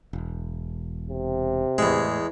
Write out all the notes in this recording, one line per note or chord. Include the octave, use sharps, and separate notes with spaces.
E1
C3
E2 A2 G#3